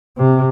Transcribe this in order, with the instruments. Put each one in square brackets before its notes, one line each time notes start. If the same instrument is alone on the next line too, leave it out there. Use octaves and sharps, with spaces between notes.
[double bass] C3